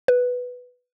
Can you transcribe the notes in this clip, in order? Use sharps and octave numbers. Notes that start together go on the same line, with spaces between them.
B4